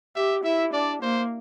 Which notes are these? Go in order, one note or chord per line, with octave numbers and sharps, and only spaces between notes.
G4 E5
E4 E5
D4 D5
A#3 C5